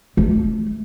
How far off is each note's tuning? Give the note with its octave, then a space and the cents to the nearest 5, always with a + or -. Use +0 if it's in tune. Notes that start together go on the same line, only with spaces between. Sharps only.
A3 -25